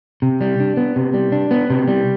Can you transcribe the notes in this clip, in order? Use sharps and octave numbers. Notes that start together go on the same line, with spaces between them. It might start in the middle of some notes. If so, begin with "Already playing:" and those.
C3
G3
D4
B3
C3
G3
D4
B3
C3
G3